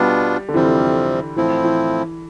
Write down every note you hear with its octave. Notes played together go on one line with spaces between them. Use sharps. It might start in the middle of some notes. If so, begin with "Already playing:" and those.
Already playing: B2 G3 B3 D4 F4
D3
F2 C3 E3 G3 C4
A2 E3 F3 C4 E4
E3